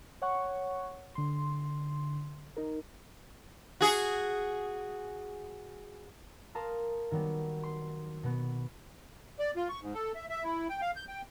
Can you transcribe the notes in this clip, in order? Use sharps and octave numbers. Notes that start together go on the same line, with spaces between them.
C#5 F#5 C#6
D3 C6
D#4 A#4
F#4 G#4
A#4 F5 A5 C6 D#6
D#3 F#3 G3 B3
C6
B2 B3
D5
F4
C#6
G#2
A4
E5
E5
E4
G5
F5
G6
G5